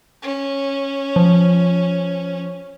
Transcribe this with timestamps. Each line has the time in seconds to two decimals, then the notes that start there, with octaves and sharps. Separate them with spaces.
0.23 C#4
1.16 F3